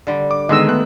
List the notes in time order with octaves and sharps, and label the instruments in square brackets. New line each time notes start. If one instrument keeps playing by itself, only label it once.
[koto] D3 G3
[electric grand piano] D6
[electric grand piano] D3 G#3 B3 [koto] D#3 [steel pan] D#5 E6
[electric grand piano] A3 B3 F#6